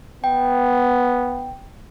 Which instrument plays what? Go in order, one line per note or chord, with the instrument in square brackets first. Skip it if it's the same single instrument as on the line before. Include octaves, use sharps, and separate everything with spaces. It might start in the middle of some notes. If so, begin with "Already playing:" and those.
[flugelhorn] B3 [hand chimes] G5